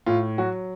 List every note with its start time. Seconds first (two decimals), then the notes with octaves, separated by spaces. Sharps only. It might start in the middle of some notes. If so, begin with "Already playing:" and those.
0.06 A2 F4
0.38 F#3 F#4